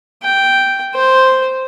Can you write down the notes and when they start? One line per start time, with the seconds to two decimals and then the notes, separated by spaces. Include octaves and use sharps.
0.23 G5
0.95 C5